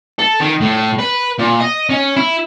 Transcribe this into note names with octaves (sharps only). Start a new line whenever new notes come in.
A4
D#3
A2
B4
A#2
D#5
C#4
E4